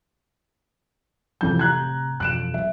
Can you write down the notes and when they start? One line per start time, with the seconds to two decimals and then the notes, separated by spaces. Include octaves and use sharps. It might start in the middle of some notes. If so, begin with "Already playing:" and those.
1.41 F2 A2 C3 E3 G6
1.59 A#5 F#6 G#6
2.20 E1 F2 F#6 D7 E7
2.54 F#3 B3 E5